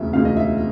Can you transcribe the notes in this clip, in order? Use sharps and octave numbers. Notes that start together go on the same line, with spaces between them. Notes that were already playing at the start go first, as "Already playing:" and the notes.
Already playing: E1 D2 C#3 E5
E1 D2 C#3 F5
D#5
E5